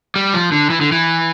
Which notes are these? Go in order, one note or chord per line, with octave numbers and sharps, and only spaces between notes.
G3
F3
D3
E3
D3
E3